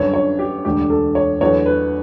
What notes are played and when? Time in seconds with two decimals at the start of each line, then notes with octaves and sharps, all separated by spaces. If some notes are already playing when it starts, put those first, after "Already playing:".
Already playing: G1 F#2 D3 C#5
0.14 C#5
0.39 G4
0.65 E1 D2 D3 G4
0.90 A4
1.15 C#5
1.41 E2 D3 F#3 A3 C#5
1.66 B4